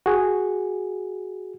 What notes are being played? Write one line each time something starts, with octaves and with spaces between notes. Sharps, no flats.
F#4 G#4